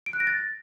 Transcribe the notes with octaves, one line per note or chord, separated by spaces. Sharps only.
D7
F#6
A#6
A6